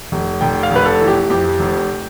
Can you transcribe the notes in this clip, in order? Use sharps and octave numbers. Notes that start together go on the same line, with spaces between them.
F1
F1 G5
F5
F1 B4
A4
E3
G4
F2 G4
F1